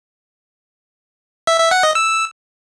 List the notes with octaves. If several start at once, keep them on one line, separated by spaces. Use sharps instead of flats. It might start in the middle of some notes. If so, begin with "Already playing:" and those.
E5
E5
F#5
D#5
E6